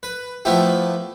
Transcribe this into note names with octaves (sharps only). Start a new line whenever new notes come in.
B4
F3 A3 B3 E4 G4